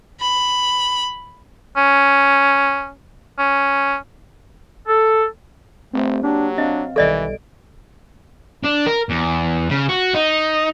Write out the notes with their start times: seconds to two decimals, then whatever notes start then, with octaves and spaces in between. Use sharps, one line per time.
0.20 B5
1.76 C#4
3.39 C#4
4.88 A4
5.93 G1 A3 C4 G4 C5
6.23 F#3 A#3 D4 G4
6.58 C4 D4 D#5 F5
6.96 B1 D#3 E3 G3 A4 D5 D#5 D7
8.64 D4
8.86 A#4
9.09 E2
9.70 C#3
9.89 F#4
10.14 D#4